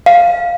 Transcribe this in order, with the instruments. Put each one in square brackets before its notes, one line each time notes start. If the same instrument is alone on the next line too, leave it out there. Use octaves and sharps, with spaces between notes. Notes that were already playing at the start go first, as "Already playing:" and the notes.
[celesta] F5